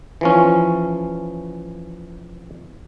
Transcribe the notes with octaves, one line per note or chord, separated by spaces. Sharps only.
E3 F3 C#4